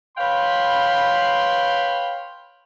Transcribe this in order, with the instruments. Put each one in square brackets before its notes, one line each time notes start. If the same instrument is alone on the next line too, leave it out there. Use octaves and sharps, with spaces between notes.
[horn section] B4 C#5 F5 G5 B5 C6